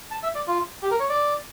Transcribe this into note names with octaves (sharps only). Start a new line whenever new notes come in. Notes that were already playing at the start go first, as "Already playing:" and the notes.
A5
E5
D5
F4
G4
A#4
C#5
D5